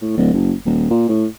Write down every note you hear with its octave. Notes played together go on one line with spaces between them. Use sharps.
A2
D1
F#1
D#1
A#2
A2